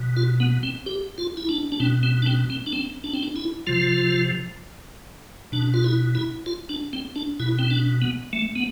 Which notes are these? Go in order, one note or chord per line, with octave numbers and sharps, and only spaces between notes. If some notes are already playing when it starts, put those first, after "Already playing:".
Already playing: B2
F4
B3
C4
G4
F4
E4
D4
D4
B2 C4
C4
D4
C4
C4
D4
C4
D4
C4
D4
E4
C3 F3 F4
B2 D4
F4
E4
E4
F4
D4
C4
D4
B2 E4
C4
D4
B3
A3
B3